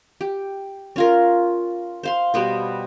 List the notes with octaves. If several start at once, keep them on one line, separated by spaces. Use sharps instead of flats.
G4
C#4 F4 A#4
C5 F5 C6
B2 G3 B3 C5